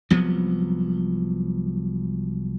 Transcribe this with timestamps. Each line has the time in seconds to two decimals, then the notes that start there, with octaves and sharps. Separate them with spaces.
0.10 C2 F3 F#3 B3